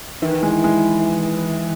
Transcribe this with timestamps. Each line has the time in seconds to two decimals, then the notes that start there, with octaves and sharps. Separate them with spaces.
0.22 D#3 E3
0.43 G#3
0.64 G#3